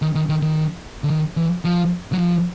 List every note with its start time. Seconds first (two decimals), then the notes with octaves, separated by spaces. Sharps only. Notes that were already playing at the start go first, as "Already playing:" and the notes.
0.02 D#3
0.15 D#3
0.29 D#3
0.42 D#3
1.04 D3
1.10 D#3
1.37 E3
1.65 F3
2.13 F#3
2.18 F3